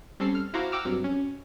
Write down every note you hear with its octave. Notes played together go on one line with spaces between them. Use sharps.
G3 C4 C#4 A4 C7
F6
E4 F#4 C5 F5 A#5 D6
F#5 G5 A#5 D6 E6 F6
G2 C3 F#3
C#4